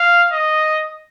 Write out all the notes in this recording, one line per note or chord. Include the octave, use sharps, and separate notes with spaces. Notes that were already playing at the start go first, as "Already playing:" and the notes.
Already playing: F5
D#5